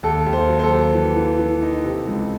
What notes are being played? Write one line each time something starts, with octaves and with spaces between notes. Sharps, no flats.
D#2 A4
D#2
C5
F#3
C5
A4
D#2
E3
E3
E3
D#4
C3
C#2